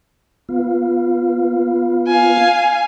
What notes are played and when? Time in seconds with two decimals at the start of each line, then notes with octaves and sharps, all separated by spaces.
0.49 B3 F4
2.08 F5 G#5